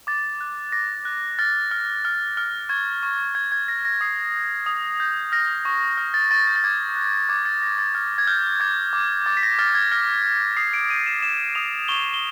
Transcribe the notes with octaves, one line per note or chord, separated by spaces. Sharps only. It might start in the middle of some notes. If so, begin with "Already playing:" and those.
D6 A6
F#6
D6 A#6
F#6
F6 A6
F6
F6
F6
C#6 G#6
C#6
C#6 G#6
G#6
F6 A#6
A#6
D#6 C7
G6
D#6
G6
F6 A#6
C#6
F6
A6
C#6 A6
G6
A6
D6 G#6
F#6
D6 G#6
A6
F#6 A#6
A6
F6 G#6
G#6
F6 G6
D6 G#6
D6
D6 A6
B6
A#6
F6 A6
G#6
F6 A#6
F6
D#6 C7
D7
G6 D#7
E7
D#6 E7
D#6 F7
C#6 G7
G7